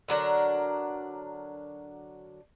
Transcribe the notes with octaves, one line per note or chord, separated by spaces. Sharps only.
D3 F#3 D4 A#4